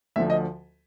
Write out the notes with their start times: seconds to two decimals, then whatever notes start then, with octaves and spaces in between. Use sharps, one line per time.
0.16 D2 D3 F3 E5
0.30 D#5